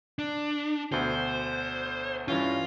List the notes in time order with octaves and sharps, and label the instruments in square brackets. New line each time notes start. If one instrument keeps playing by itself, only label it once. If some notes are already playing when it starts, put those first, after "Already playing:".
[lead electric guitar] D4
[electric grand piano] D2 B2 D3 [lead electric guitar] C5
[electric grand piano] G2 E3 C#4 [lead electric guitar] F4